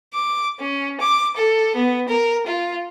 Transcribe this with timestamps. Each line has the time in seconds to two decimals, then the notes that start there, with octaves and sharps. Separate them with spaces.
0.14 D6
0.60 C#4
1.00 D6
1.36 A4
1.75 B3
2.08 A#4
2.47 F4